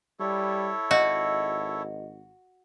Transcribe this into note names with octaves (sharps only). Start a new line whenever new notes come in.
G3 E4 A4 C#5
G#1 F#4 D#5